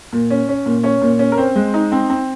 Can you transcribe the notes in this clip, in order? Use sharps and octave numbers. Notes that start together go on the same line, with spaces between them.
A#2
C#4
C#4
A#2
C#4 C#5
A#2
C#4
A#4
C4 C5
G#3
D#4
C4
C4